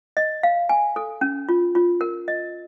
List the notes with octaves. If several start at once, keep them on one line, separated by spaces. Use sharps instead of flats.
D#5
F5
G#5
A4
C#4
F4
F4
A#4
D#5